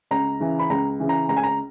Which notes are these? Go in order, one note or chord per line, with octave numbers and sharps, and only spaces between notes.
C#2 A#5
C#3 E3
B5
C#2 A#5
C#3 E3
A#5
C#2 A#5
G#5
A#5